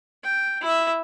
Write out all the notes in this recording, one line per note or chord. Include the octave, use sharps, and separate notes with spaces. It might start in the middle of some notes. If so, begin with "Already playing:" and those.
G5
E4 E5